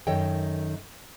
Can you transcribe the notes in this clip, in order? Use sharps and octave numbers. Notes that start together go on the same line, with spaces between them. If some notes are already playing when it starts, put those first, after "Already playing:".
F#2 D#3 A4 C#5 D#5 G5